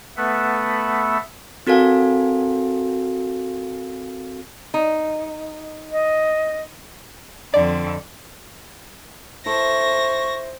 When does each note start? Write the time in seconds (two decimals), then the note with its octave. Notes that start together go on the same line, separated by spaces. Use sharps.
0.17 A3 B3 A4 B4 E5 F#5
1.67 C4 F#4 A4 A#4 F5 G#5
4.74 D#4
5.92 D#5
7.54 F2 D3 D5
9.46 E4 A4 C5 C#6 A#6